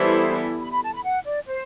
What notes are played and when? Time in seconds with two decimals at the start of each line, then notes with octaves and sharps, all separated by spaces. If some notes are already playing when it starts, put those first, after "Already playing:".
Already playing: E3 G3 B3 E4 A4 C5
0.61 B5
0.72 B5
0.84 A5
0.94 B5
1.04 F#5
1.25 D5
1.47 C5